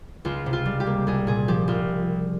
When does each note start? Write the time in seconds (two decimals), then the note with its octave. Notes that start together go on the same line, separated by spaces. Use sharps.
0.25 C#2 F4
0.46 C3
0.53 F4
0.65 G3
0.80 G4
0.86 A#3
1.07 C2 G#4
1.27 A#2 G#4
1.48 F3 G4
1.68 C2 F4